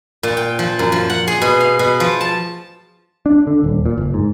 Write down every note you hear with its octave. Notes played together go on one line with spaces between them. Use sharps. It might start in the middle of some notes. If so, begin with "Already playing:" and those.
A#2
G5
F3
F#2
F3
F#5
G#4
B2
F5
B2
F3
A5
D4
D3
D#1
A#2
F#1
G#2